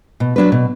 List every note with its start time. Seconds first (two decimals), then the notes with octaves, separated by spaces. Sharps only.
0.20 B2
0.36 F#3 D4 B4
0.52 B2